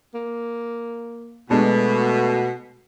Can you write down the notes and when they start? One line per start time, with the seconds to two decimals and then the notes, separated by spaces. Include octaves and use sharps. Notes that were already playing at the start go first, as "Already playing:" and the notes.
0.14 A#3
1.51 B2 G#3 A3 B3 D4